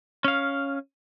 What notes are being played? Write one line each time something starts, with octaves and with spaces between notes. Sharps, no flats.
C#4 F5